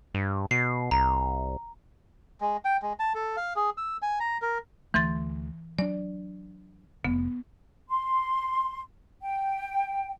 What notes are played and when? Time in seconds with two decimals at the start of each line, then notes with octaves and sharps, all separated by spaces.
0.14 G2
0.51 B2 C7
0.91 C2 A#5
2.41 G#3
2.65 G5
2.82 G#3
3.00 A5
3.15 A4
3.37 F5
3.56 G#4
3.77 E6
4.02 G#5
4.20 A#5
4.42 A#4
4.94 D2 E3 A3 C6 A6
5.79 F#3 D4 D5
7.05 F1 B3
7.89 C6
9.22 G5